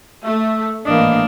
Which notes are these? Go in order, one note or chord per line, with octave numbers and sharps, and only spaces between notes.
A3 E5
G#1 A2 E3 A#3 D4 D#5